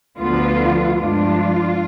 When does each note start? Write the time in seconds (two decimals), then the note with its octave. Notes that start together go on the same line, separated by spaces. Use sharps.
0.18 D2 D3 F3 B3 F4
0.98 G2 F3 G#3 D4 F4